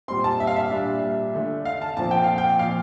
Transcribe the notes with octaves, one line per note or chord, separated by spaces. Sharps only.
A#2 G3 C4 C6
A5
E5
F5
E5
A#2 G3 D4
D3 A3 D4
F5
A5
A#2 F3 C4 A5
G5
F5
G5
A#2 F3 C4 F5